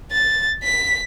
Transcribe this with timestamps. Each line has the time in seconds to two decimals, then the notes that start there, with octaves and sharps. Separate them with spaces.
0.12 A6
0.63 B6